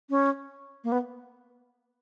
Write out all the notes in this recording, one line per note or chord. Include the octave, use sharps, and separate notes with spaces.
C#4
A#3
B3